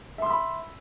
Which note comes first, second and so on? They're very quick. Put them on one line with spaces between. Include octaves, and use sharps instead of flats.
E5 C6 E6 B5